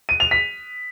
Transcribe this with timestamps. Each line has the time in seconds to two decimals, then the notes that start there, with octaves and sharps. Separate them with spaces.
0.09 D#7
0.20 F7
0.31 B6